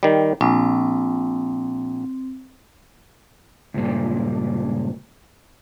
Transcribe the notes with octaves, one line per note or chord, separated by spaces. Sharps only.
D#3 G3
A#1 C4
C#2 G2 A#2